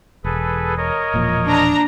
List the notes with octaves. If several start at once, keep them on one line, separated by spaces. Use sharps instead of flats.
E1 G#4 A4 B4
A#4 C#5 D#5
E1 A#2 F3
D4 A#5